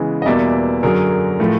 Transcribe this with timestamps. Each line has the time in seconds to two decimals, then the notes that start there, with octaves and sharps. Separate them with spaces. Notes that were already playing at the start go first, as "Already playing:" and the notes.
Already playing: C#3 E3 G#3 B3
0.22 D#5
0.26 E2 B2 G3 A#3 D5 E5
0.83 F#2 D3 F#3 G#4 A#4
1.40 A2 F3 A3